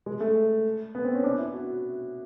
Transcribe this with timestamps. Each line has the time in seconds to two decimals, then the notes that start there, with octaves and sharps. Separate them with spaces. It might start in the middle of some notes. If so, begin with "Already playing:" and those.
0.06 G#3
0.20 A3
0.95 B3
1.05 C4
1.15 C#4
1.24 D4
1.38 E4
1.54 F#4